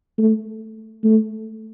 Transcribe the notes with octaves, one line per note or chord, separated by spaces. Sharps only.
A3
A3